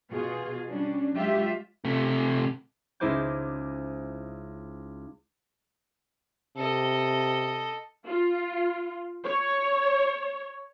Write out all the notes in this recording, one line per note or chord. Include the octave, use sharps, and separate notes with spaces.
B2 F4 G#4
G3 C#4 D4
F#3 G#3 F4 G4 E5
C3 A3
C#2 D#4 E4 C5 D6 G6
C3 A4 D#5
F4
C#5